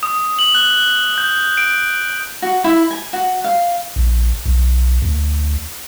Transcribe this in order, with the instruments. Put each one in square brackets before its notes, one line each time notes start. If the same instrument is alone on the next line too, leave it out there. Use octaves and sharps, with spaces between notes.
[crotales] D#6
F#7
F#6
F#6
G6
D7
[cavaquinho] F#4
E4
G#5
F#4
F5
[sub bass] A#1
B1
D2